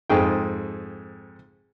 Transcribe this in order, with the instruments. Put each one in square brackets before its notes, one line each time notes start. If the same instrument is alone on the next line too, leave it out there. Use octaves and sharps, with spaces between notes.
[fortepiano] F2 G#2 G#4 G5